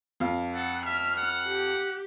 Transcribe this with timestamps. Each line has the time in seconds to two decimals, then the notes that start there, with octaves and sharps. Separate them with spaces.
0.20 F2 F5
0.55 A4 F#5
0.86 E5 F6
1.18 F#5
1.48 G4